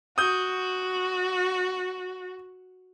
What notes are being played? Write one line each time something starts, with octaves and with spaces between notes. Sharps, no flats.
F#4 D#6 G6